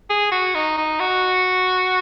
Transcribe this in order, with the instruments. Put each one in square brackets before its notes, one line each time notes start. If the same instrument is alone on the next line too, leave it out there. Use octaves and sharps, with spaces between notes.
[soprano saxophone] G#4
F#4
D#4
D#4
F#4